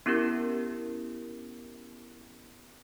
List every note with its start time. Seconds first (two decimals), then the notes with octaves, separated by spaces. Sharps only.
0.06 B3 C#4 E4 G4 A#4